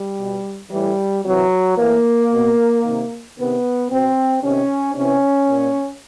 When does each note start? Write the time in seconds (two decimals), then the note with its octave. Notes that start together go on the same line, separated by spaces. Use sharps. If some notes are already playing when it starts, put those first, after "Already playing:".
Already playing: G3
0.17 B2
0.70 A2 E3 G3
1.24 C3 E3 F#3
1.77 A2 E3 A#3
2.31 B2
2.83 C3 D#3
3.36 C3 D#3 B3
3.89 B2 C4
4.42 C3 D#3 C#4
4.95 C3 E3 C#4
5.48 A#2